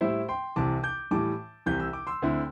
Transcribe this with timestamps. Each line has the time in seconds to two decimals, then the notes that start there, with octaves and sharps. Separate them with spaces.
0.01 A2 G3 E4 C5 E5
0.28 G5 C6
0.56 C2 C3 E3 A5 D6
0.83 D6 G6
1.11 A2 E3 G3 A5 D6
1.66 C2 C3 E3 G6
1.80 E6
1.93 D6
2.07 C6 E6
2.22 D2 D3 C4 E4